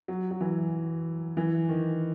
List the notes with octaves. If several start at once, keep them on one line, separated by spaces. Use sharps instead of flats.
F#3
F#3
E3
E3
D#3